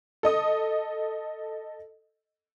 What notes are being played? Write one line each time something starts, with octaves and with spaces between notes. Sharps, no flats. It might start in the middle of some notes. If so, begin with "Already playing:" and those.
A4 D#5 D#6